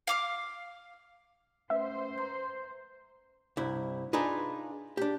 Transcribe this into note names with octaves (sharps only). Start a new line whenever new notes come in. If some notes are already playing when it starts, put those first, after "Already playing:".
F5 D6 F6
A3 C#4 B4 C5 E5
A#5 C6 G6
C2 G2 E4
D4 D#4 F4 G#4 B4
D4 G4